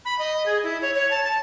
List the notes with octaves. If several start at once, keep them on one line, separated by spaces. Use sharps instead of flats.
B5
D#5
G#4
E4
C#5
C#5
A5
A5